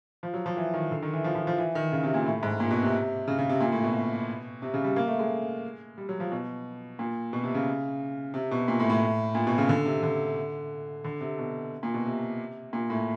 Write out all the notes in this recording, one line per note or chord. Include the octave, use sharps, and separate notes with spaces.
F3
F#3
F3
E3
D#3
D3
D#3
E3
F3
F3
F3
E3
D#3
C#3
C3
A#2
A2
G#2
A#2
B2
C3
C#3
C#3
C3
A#2
A2
B2
C3
C#3
G3
A#3
A3
G#3
G3
F#3
F3
B2
A#2
B2
C3
C#3
C3
B2
A#2
A2
A2
A#2
B2
C#3
D3
C3
D3
D3
C3
B2
A#2
B2
C3
A#2
A2